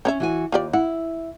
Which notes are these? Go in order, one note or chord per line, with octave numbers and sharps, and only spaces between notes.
C4 C#4 C#5 E5
E3 F#4 G#5
D#2 F4 G4 D5
E4 F#5